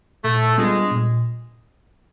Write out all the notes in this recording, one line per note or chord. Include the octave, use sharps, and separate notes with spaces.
A#2 A3
G3 G#3 B3 D4 F4
A#2